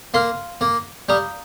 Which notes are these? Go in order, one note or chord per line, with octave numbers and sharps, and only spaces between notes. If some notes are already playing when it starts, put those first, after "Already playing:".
A#3 F5 C6 F6
A#3
G3 F5 A#5 D#6 G6